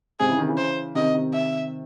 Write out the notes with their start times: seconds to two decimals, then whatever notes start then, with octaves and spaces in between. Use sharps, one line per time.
0.20 G#2 C3 G#4
0.29 C#3 E3
0.38 C3 D#3
0.48 C#3 E3
0.58 C5
0.95 C3 D#3 D#5
1.15 C3 D#3
1.33 E5